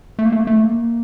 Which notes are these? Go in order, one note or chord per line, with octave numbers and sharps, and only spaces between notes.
A3
A#3
A3
A#3
A3
A#3